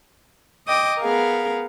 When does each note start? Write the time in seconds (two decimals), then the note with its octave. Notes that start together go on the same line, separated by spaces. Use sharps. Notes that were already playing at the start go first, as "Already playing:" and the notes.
0.67 D#5 G5 D6 D#6
1.00 B3 G#4 A#4 F5